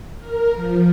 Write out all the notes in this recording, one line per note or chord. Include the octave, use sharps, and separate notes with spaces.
A#4
F3